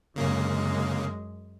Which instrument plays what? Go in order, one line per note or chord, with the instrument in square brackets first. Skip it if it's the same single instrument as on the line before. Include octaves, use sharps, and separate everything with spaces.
[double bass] F#2 G#3 [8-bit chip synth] C#3 A#3 C#4